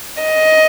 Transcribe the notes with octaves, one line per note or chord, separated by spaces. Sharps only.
D#5